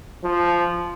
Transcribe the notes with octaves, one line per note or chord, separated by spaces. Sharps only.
F3